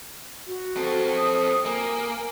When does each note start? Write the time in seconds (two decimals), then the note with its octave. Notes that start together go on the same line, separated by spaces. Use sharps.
0.47 F#4
0.77 C4 A4
1.17 D#6
1.66 A#3 G#5